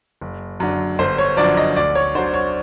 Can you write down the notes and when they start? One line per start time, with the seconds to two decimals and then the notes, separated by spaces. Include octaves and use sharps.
0.21 F#1
0.60 F#2 D3
0.99 G1 C5
1.18 C#5
1.37 F#2 D3 F3 D5
1.57 D#5
1.76 D2 D5
1.95 C#5
2.15 D3 F#3 C5
2.34 C#5